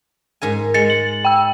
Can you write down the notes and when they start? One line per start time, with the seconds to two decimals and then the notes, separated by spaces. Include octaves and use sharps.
0.42 G#2 A#4 G#5
0.74 G#3 A6 C#7
0.90 F#7
1.25 G5 E6